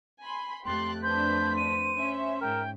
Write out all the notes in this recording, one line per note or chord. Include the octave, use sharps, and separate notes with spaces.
G#5 B5 C6
F2 A3 G4 C6 F#6 A6
D4 B4 C5 G6 B6
D#7
C#4 E5
G#2 A#4 G5